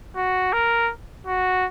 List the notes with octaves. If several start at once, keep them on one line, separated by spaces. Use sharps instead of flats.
F#4
A#4
F#4